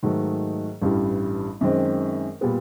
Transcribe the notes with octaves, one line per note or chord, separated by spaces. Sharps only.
G#2 D#3 F#3 A3
A1 G2 E3 G3
F#2 D#3 G#3 C4
A#2 G3 B3